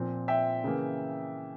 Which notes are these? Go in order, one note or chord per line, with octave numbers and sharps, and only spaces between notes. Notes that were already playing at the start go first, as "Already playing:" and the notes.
Already playing: A#2 F3 C4
E5 G5
C#3 E3 A#3